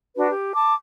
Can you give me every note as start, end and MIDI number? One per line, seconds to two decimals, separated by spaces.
0.16 0.30 62
0.16 0.30 66
0.16 0.30 71
0.31 0.53 67
0.55 0.72 81
0.55 0.72 86